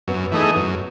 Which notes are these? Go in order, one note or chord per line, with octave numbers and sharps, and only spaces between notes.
F#2 B3
E3 A3 D#4 G#4
F#2 B3